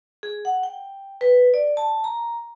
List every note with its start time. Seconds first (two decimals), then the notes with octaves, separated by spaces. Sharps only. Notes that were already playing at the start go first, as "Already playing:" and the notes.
0.23 G#4
0.45 F#5
0.63 G5
1.21 B4
1.54 D5
1.77 A5
2.04 A#5